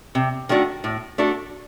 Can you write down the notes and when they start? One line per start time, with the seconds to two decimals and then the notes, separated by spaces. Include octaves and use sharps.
0.15 C3
0.49 D#3 A3 D4 F#4
0.84 A2
1.18 A3 D4 F#4 A4